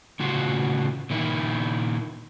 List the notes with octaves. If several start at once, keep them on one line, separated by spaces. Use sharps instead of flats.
A2 C#3 F4 F#4
A#2 D#3 E4